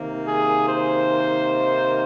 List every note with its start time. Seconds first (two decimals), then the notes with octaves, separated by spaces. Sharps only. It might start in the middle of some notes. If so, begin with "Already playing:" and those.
Already playing: C3 D#3 A#3
0.26 G#4
0.67 C5